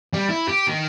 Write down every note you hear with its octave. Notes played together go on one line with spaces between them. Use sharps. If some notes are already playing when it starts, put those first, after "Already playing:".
G3
E4
G4
D#3